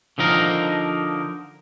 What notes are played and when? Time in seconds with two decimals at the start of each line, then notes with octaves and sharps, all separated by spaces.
0.18 D3 F3 D#4 A#4